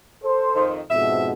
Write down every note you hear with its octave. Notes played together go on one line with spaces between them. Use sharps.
A4 C5
F2 D#3
F2 G#2 B2 E5